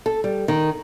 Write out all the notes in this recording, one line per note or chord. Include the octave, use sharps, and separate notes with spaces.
A4
G3
D#3